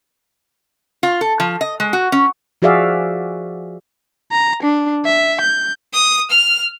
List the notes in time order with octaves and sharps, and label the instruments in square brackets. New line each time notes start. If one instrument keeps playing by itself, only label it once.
[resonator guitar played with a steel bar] F4
A4
F3
D#5
G#3
F#4
C#4
[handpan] F3 F#4 G#4 D5 E5 F5
[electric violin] A#5
D4
E5
G6
[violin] D#6
F6